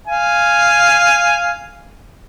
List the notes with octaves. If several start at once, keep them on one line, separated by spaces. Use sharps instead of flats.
F5 G#5